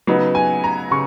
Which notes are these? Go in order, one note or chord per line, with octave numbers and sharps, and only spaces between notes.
C#3 F#3 B3 D#4
G#5
A#5
C#3 C#6